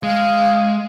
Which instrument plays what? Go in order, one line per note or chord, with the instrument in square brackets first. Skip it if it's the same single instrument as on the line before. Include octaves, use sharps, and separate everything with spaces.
[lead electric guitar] G#3 [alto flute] F5